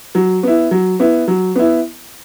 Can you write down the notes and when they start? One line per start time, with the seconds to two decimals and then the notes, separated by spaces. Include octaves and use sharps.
0.15 F#3
0.43 B3 E4
0.71 F#3
1.00 B3 E4
1.28 F#3
1.56 B3 E4